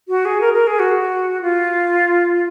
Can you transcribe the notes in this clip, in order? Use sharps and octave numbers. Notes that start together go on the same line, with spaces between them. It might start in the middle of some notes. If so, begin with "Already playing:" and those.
F#4
G#4
A#4
A#4
G#4
F#4
F4